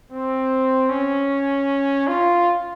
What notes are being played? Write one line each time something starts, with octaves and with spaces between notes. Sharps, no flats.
C4
C#4
F4